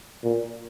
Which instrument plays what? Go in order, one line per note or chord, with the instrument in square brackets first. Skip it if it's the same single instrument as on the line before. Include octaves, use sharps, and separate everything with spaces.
[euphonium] A#2